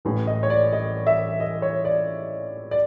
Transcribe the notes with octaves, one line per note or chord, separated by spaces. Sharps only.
A1 A2 E3
D#5
C#5
D5
D#5
E5
D#5
C#5
D5
D5